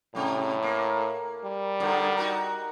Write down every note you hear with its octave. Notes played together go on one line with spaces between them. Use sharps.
A2 C3 G3
A#3
G3
G2 A#2 D3
D#4 F#4 A#4